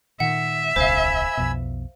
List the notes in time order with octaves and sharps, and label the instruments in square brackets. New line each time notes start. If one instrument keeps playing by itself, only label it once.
[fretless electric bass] A#2 D#3 [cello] E5 [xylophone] F#5
[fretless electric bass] D1 B1 C#3 [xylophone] C5 F5 [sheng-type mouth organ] G#5 B5 E6
[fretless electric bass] B1 F2 B2